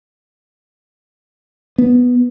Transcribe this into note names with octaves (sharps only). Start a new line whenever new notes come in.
B3